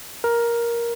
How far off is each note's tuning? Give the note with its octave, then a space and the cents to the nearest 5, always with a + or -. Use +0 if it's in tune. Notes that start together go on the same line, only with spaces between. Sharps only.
A#4 +10